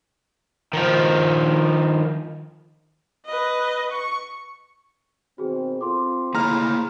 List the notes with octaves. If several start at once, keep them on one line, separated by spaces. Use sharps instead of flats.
D#3 F3
B4 D#5
C#6
B2 D#3 C4 F#4 G#4
C4 F4 A4 C6 D6
D#2 C#3 A3 A#3 E4 G#4 A#5 F6